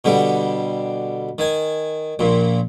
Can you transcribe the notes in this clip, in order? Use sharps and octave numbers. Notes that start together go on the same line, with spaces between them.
B2 D3 G3
D#3 G#5
A#1 A#2